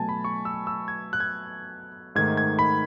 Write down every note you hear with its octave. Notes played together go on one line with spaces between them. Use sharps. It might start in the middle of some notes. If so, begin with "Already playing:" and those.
Already playing: B2 F#3 A3 G#5 A5
B5
C#6
E6
E6
G#6
F#6
G#6
G#2 D#3 A3 G#6
G#6
B5